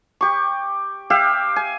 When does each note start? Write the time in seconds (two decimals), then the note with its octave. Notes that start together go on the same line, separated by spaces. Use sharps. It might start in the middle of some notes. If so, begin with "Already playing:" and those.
0.21 G4 C#6
1.10 G4 E5 F5 G5
1.56 G#5